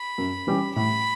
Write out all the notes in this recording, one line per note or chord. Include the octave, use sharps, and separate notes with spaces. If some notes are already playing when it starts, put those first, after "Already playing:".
Already playing: B5
F#2
E3 G3 C#4 G4
A2 B5